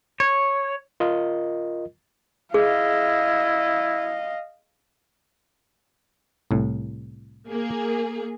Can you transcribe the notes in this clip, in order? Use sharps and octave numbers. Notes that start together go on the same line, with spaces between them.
C#5
F4 A#4 D#5
E4 G#4 D#5 F5
C2 A2
A#3 G#4